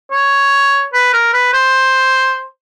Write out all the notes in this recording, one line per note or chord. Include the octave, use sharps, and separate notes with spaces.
C#5
B4
A#4
B4
C5